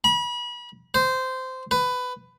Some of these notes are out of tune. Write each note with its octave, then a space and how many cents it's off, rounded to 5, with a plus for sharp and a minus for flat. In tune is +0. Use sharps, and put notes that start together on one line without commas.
B5 -35
C5 -15
B4 +15